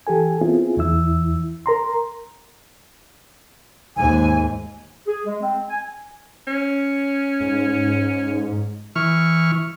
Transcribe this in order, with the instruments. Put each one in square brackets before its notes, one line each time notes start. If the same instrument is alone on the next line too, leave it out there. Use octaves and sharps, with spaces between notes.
[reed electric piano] E3 G4 A4 G#5
B3 C4 E4 F4 G#4
E2 E3 E4 E6
A#4 A#5 C6
[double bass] D#2 G#2 [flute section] G#5
[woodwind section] G#4
G#3
C4
G#5
[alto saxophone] C#4
[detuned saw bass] G#2
[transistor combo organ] E3 C#6 F6